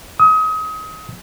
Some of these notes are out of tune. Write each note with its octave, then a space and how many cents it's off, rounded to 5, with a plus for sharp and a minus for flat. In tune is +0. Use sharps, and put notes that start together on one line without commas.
D#6 +30